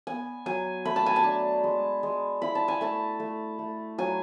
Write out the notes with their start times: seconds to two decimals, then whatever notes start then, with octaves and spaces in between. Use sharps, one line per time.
0.07 B3 G#5
0.46 F#3 G#5
0.85 A3 B5
0.96 A5
1.06 G#5
1.16 A5
1.24 D4
1.64 G#3
2.03 G#3
2.42 E4 B5
2.55 A5
2.68 G#5
2.81 A3 A5
3.20 A3
3.59 A3
3.98 F#3 G#5